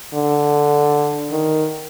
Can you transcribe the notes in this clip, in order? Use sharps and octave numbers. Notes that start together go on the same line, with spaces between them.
D3
D#3